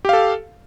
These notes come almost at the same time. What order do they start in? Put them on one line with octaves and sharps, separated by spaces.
G4 F5 A4